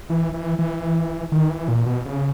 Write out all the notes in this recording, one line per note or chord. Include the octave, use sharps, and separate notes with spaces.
E3
E3
E3
D#3
E3
A#2
B2
C#3